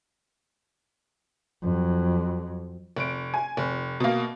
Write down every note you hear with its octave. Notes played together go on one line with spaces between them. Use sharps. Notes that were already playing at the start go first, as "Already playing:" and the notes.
F2 F#3
F1 D7
G#5
F1
B2 A#3